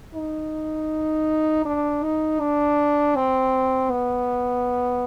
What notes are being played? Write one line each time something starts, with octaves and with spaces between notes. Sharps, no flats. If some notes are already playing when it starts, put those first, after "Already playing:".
D#4
D4
D#4
D4
C4
B3